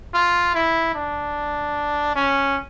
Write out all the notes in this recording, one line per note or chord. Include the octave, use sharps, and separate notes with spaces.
F4
E4
D4
C#4